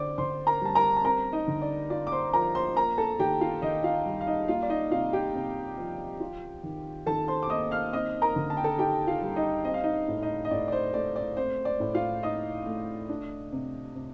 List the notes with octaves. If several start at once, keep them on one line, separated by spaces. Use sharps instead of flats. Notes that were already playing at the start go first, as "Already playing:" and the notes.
Already playing: D3 C5 D5 D6
D3 C5 C6
A#4 A#5
G3 A5
A#4 A#5
A5
C4 A#4 A#5
D#4 D#5
D3
D5
F4 D5
D6
C5 C6
F3 A#4 A#5
C5 C6
A#3 A#4 A#5
A4 A5
D#3 G4 G5
F4 F5
D#3 D#4 D#5
F4 F5
G3
F5
D#4 D#5
A#3 F4 F5
D5
D#4 D#5
C3 F4 F5
G4 G5
C3
F3
F4
D#3
D#3 A4 A5
C5 C6
D6
A#3 D#5 D#6
F5 F6
C4 D#5 D#6
A#4 A#5
D3
A5
G5
A4 A5
D#4 G4 G5
F4 F5
G3
D#4 D#5
C4 D#5
F5
D#4 D#5
A2
D#4 D#5
D#5
A2 D5
D5
C5
A3 D5
D5
C4 C5
D5
A2
F4 F5
D#4 D#5 D#6
A3
D4
C3
C3